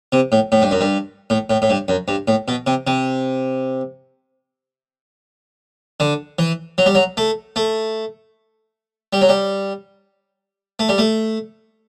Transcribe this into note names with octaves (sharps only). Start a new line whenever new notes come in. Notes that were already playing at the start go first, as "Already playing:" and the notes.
C3
A2
A2
G2
F#2
G2
A2
A2
A2
G2
F#2
G2
A2
B2
C3
C3
D3
E3
F#3
G3
F#3
A3
A3
G3
F#3
G3
A3
G3
A3